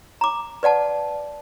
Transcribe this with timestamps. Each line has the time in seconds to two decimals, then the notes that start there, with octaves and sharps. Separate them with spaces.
0.21 A#5 D6
0.63 B4 D5 F#5 A5